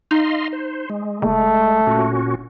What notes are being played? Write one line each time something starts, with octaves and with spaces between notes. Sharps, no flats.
D#4 D#5 F5 C6
C5
G#3
F#1 A3
A#2 C#4 F#4